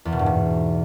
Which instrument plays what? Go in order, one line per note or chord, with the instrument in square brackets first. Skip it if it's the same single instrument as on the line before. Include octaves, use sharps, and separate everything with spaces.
[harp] E2
B2
G2
G#2